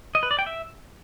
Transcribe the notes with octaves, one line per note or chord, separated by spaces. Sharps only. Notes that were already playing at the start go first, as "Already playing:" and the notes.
D#5
B4
D5
G5
E5